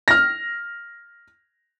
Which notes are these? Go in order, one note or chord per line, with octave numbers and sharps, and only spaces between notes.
F6 A#6